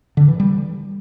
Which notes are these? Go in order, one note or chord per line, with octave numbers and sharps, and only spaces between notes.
D3
E3
G3